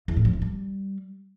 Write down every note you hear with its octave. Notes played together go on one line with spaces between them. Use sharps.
E2
A2
F#3
E3
G3